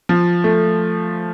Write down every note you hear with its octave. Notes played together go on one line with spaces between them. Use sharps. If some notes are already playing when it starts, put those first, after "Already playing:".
F3
A3